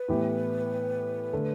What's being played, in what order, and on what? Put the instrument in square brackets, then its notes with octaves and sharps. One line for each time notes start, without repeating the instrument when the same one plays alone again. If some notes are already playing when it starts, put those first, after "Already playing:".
Already playing: [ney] B4
[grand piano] A2 E3 B3 E4 G4
D3 A3